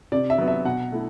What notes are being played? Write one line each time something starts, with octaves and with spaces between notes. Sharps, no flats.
C3 D5
E5
F#3 B3
E5
B2 F#5
A3 E4